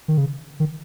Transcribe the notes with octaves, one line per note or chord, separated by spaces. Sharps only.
D#3
C#3
D#3